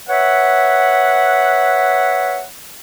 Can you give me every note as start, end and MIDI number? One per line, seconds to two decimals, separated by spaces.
0.08 2.43 71
0.08 2.43 73
0.08 2.43 76
0.08 2.43 78